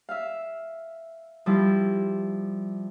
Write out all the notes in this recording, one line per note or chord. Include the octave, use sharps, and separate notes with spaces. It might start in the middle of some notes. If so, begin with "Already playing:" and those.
E5 F5
F3 G3 E4